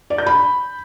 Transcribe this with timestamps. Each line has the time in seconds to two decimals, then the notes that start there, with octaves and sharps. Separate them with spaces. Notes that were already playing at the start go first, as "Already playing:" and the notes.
0.10 D5
0.18 G6
0.26 B5